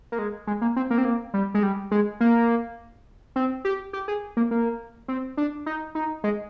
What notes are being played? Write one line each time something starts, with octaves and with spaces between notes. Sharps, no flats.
A#3
G#3
G#3
A#3
C4
A#3
C4
A#3
G3
G#3
G3
G#3
A#3
C4
G4
G4
G#4
A#3
A#3
C4
D4
D#4
D#4
G#3